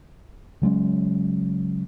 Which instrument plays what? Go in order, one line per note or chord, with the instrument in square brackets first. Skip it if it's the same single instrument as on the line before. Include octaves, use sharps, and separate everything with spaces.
[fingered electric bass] C#3 F#3 G#3 C#4